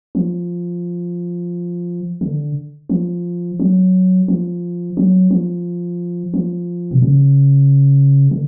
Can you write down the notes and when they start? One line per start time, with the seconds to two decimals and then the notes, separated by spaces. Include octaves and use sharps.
0.15 F3
2.21 D3
2.89 F3
3.60 F#3
4.28 F3
4.97 F#3
5.31 F3
6.34 F3
6.91 B2
7.02 C#3
8.31 D3